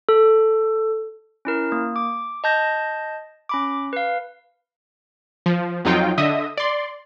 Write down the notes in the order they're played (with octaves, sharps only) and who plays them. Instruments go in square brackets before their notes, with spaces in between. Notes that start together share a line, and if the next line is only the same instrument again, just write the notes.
[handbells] A4
C#4 E4 A#4
A#3
D6
D#5 A5 G6 A#6
C#4 B5 D6
B4 F5
[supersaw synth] F3
F2 F#3 D#4 F4 G5
D3 D#5 E5 D#6
D5 C6